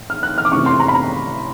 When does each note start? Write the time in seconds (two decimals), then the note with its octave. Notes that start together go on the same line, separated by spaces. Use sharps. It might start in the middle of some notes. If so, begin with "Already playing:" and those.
Already playing: A2
0.10 F6
0.23 F#6
0.38 F6
0.45 D6
0.52 C3 E3 A3 C#4 C#6
0.66 C6
0.80 A#5
0.88 B5
0.94 A#5